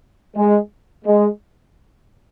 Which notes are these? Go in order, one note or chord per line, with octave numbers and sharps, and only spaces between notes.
G#3
G#3